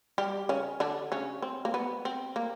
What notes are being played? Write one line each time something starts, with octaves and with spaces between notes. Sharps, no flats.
G3 G4
C#3 C#4
D3 D4
C#3 C#4
C4
A#3
B3
C4
A#3